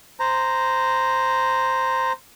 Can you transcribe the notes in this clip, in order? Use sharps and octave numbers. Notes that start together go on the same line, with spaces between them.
C5 A#5